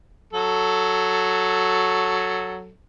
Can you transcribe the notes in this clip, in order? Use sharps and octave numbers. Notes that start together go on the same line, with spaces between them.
F#3 A4